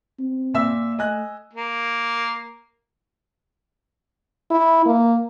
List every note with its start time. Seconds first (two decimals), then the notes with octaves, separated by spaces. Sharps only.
0.19 C4
0.54 A#2 E5 E6
0.99 A3 D#5 G#5 F#6
1.53 A#3
4.51 E4
4.86 A#3